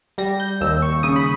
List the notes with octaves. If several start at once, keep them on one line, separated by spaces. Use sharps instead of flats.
G3 A#6
G6
D#2 E6
C#6
C#3 D#6
B5